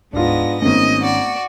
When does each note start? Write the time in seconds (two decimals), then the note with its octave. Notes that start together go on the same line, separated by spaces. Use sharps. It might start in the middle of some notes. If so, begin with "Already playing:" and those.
0.13 D1 G#2 B3 D4 F4 A#6
0.62 G#1 A3 B3 C#4 D#5
1.01 F#4 D5